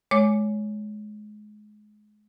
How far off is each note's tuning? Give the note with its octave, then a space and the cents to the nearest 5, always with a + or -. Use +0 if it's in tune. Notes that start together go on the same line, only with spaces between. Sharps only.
G#3 +25 C#5 +15 D6 +0